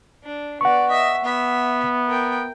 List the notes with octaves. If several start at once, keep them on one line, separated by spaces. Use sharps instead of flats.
D4
B3 D5 F#5 C#6
D#5 E5
B3 E5
A#4 G5